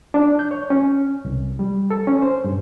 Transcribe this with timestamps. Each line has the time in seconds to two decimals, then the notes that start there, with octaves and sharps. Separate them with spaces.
0.14 D4
0.39 G6
0.51 C#5
0.70 C#4
1.25 C2
1.59 G3
1.90 A4
2.07 C#4
2.22 C5
2.44 G2